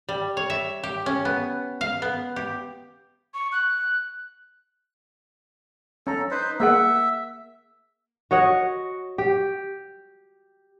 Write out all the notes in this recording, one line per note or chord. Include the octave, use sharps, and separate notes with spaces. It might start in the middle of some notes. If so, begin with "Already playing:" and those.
G3
C#5
E5
G4
C#4
B3
F5
B3
G4
C#6
F#6
C#4 A4 A#5
D#4 B4 C5
A#3 G#4 E5 F#5
F#4 C#5 D#5 F#5
G4